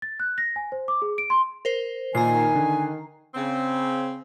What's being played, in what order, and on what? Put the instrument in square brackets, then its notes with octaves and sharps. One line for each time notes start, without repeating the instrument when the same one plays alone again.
[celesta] A6
F#6
A#6
G#5
C5
D6
G#4
D7
C6
[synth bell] A#4 C5
[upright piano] A#2 [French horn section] D#3 [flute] G#5 [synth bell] A#5 C7
[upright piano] D3
[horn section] C#3 C4